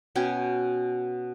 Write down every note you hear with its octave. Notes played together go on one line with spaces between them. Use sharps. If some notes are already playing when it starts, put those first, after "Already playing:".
B2 C#4 G5 G#5